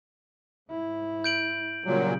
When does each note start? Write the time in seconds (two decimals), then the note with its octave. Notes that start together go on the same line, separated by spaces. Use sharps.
0.70 G#2 E4
1.24 G6 D7 F#7
1.84 A#2 C#3 F#3 G3